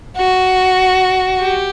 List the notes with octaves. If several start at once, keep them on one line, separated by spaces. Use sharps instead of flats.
F#4
G4